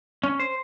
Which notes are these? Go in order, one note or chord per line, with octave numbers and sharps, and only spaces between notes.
C#4
C5